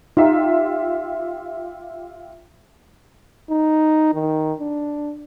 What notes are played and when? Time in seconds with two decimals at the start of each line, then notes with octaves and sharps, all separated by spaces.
0.17 D#4 F4 G4 E5
3.50 D#4
4.14 D#3
4.60 D4